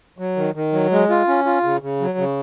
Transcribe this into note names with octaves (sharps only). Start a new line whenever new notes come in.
F#3
D#3
D#3
F#3
G#3
F4
C#4
F4
C#3
C#3
F#3
C#3